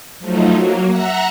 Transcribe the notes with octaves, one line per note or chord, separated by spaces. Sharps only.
F3 F#3 A3 D#4
F#3 A#3
E5 F#5 A#5 F#6